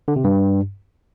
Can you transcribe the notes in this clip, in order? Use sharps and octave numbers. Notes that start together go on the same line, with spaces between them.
D3
C3
G2